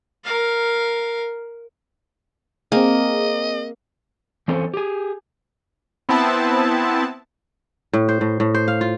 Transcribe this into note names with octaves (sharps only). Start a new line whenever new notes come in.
A#4 F5
A#3 C4 G#4 D#5
E3 C4 C#4 A4 A#4 C5
G4 G#4
B3 C4 E4 A5
A2
C5
A2
A2
C5
F5
F4